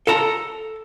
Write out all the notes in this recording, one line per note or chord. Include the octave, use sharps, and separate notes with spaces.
A4 A5 A#5